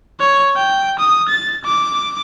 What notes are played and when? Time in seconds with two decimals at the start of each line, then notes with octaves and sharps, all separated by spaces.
0.20 C#5
0.56 G5
0.99 D#6
1.29 A6
1.64 D6